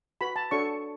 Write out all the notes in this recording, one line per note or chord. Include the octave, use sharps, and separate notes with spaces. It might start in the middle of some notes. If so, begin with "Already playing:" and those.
F#4 B4 B5
A5
D4 F#4 A4 C#5 C#6